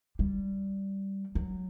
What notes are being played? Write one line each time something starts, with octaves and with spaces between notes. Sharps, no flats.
G3
F#3